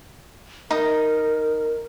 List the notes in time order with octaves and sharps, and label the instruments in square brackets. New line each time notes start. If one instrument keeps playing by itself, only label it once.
[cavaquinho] D#4 D#6 [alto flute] A#4